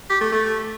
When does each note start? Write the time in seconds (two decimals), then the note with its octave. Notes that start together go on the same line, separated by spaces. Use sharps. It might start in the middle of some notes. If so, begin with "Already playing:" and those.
0.10 G4
0.21 A3
0.32 A3